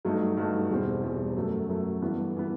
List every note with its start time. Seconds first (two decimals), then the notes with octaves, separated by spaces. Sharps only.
0.05 G2 F#3 A3 D#4
0.37 G2 F#3 A3 D#4
0.70 E2 B2 G3 C4
1.03 E2 B2 G3 C4
1.36 F#2 F#3 A3
1.69 F#2 F#3 A3
2.02 G2 E3 B3
2.36 E3 B3